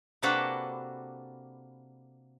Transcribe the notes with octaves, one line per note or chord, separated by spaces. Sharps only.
C3 A#3 D4 F#4 A4 B4